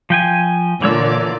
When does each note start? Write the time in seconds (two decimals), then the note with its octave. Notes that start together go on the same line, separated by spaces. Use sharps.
0.10 F3 G5 G#5
0.82 A#2 D3 E3 C#5 D5 E6